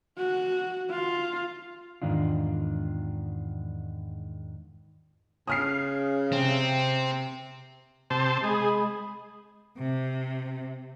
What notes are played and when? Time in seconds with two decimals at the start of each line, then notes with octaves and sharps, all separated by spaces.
0.18 F#4
0.90 F4
2.02 E2 G#2 D#3 D4 F4
5.47 C#3 D#6 F6 C7
6.32 C3 C4
8.10 C3 C5 A5
8.44 G#3 G#4 B5 D#6
9.78 C3